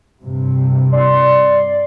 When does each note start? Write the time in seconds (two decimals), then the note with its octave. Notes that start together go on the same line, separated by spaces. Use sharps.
0.25 G2 C3
0.92 D5 C6